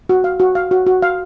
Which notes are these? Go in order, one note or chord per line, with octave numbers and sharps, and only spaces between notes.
F#4
F5
F#4
F5
F#4
F#4
F5